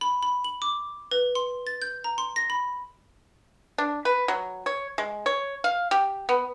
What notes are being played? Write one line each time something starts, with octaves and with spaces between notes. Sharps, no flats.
B5
B5
F#7
D6
B4
C6
A6
G6
A#5
C6
A#6
B5
D4
B4
F#3
C#5
G#3
C#5
F5
G4
B3